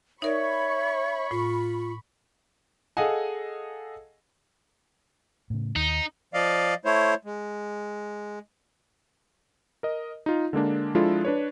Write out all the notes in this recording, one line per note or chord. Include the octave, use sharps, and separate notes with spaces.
D#4 A#4 C#5 D5 E5 B5 C#6
A2 F4
G#4 A4 D#5 F5 F#5 G#5
A2 C#3
D#2 D#4
F3 D5 D#5 F5
A3 E4 C5 C#5
G#3
A#4 D#5
D#4 F4
D3 G#3 A#3 D4
F3 G#3 D4 E4 F4 A4
D4 B4 C#5